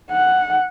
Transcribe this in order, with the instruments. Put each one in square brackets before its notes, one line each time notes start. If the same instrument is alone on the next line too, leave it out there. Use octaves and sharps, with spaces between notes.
[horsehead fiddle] F#5